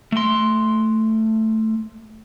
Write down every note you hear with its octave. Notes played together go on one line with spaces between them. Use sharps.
A3 C6